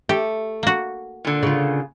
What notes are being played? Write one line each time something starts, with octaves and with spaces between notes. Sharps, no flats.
A3 G4
A#3 F#4
A#2 D3
C#3 F4